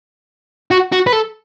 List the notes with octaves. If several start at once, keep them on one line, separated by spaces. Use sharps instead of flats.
F#4
F#4
B4
A4